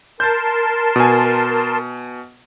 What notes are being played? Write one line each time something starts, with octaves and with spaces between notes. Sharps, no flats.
A#4 A5 C6 G6 A6
B2 G#5